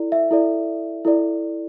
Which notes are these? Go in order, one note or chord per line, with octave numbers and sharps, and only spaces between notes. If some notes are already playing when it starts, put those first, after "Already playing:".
Already playing: E4 A4 D5
E5
E4 A4 D5
E4 A4 D5